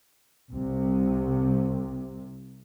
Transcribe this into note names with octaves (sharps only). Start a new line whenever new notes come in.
C2 C3